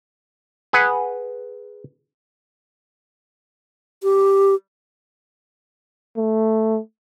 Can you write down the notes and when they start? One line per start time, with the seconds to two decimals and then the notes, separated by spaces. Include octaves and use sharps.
0.73 G#4 B4 F#5
4.03 G4
6.17 A3